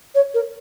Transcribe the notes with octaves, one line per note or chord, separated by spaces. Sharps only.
C#5
A#4